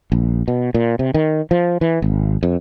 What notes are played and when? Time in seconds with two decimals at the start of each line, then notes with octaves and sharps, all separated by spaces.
0.12 A#1
0.48 B2
0.74 A#2
0.99 C3
1.14 D#3
1.51 F3
1.81 E3
2.02 G#1
2.43 F2